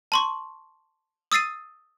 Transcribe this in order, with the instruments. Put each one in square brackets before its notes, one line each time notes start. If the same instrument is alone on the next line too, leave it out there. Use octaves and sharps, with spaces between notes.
[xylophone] A5 C6 C#6
D#6 E6 A6 C7 D#7